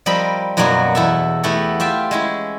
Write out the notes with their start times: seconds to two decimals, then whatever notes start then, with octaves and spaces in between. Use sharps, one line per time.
0.06 F3 G3 C4 A#4 D#5 B5
0.57 F#2 B2 F#3 G3 A#3 F#4
0.95 E2 E4 A4 E5
1.43 A3 B3 E4 F#4 G4 A4
1.80 F4 G4 E5 G5
2.11 G#3 C#4 E4